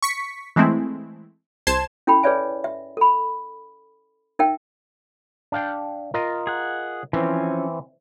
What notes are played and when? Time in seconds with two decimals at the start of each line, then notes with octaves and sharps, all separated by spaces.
0.02 C#6 B6 C#7
0.56 E3 G#3 A3 C4 E4
1.67 C2 C5 A5 C6 G#6 E7
2.07 C#4 E4 A4 G5 B5
2.23 G#4 B4 C#5 D5 E5 G#5
2.64 E5
2.97 A4 B5
4.39 D#4 A#4 E5 G5
5.52 D4 F5 G5
6.14 F4 A#4 D#5
6.47 G#4 F#5
7.13 E3 F3 C4 C#4